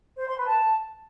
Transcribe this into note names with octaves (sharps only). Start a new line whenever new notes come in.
C5
C6
B4
A5